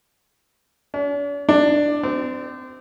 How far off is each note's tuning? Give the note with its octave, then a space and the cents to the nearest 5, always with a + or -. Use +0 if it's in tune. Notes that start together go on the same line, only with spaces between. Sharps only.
D4 -45
D4 +10
C4 -25